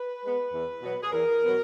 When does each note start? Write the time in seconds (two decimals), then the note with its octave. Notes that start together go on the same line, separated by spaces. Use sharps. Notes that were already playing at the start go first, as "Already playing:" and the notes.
Already playing: B4
0.22 G#3 B3
0.52 E2
0.82 B2 F#3 B3
1.03 G#4
1.12 E2 A#4
1.42 B2 F#3 B3